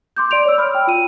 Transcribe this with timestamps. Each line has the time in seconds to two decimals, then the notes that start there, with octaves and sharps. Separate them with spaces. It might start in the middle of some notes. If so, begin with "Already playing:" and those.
0.16 C6 D6 G6
0.31 D5 D7 F7
0.45 C#5 E6
0.58 B5 E6 F6
0.74 G5
0.87 F4 G5 D#7